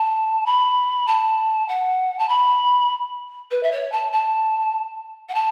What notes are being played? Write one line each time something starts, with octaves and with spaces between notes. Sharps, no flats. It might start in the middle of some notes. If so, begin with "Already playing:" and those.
Already playing: A5
B5
A5
F#5
A5
B5
B4
E5
C#5
A5
A5
F#5
A5